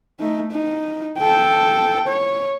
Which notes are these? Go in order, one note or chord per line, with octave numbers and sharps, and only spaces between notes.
A3 D#4
D#4
A4 G5
C#5